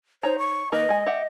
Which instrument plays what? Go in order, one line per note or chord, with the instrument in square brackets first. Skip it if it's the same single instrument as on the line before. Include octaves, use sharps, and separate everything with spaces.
[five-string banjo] D#4 C#5 A#5 [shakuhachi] C5
[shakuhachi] C#6
[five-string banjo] D#3 A#3 B4 [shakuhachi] D#5
[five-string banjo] G#3 G#5
G4 E5 F#5